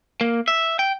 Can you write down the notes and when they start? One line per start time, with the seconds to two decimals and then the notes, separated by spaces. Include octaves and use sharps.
0.21 A#3
0.48 E5
0.79 G5